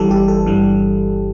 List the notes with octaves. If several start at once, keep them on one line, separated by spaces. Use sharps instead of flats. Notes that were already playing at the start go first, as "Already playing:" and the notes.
Already playing: G1 G2 E3 G3 G4 A4
G4
A4
G1 G2 E3 G3